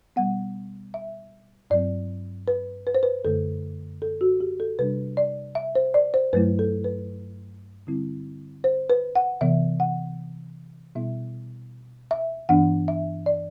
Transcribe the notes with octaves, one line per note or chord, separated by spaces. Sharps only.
B2 G3 B3 F#5
E5
G2 F#3 C4 D5
B4
B4
C5
B4
F#2 D3 A3 A4
A4
F#4
G4
A4
C3 G3 D4 B4
D5
E5
C5
D5
C5
G2 F#3 A3 E4 B4
A4
B4
D3 G3 C4 E4
C5
B4
F#5
C3 E3 B3 E5
F#5
B2 G3 B3 E4 E5
E5
G2 E3 B3 D4 F#5
E5
D5